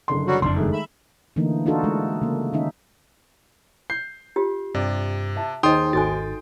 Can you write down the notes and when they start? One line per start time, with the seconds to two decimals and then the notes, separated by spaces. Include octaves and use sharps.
0.08 F#1 D3 C6
0.27 F#3 G3 F#4
0.42 F#1 F2 G3 D4 C6
0.56 D#3 G#3 A3
0.73 E5 B5
1.36 D3 E3 A3 A#3 D#4
1.66 D4 D#4 F4 F#4 A4
1.84 G#3 A3 D4
2.21 C#3 A#3
2.53 D#3 C#4 D#4 E5
3.90 G6 C7
4.36 F4 G4
4.75 G2 C3 D5
5.36 E5 A5
5.63 D#2 D#4 G#4 C5 D#5 G5 C6 D#6
5.93 G#1 F#4 A4 G#5 A6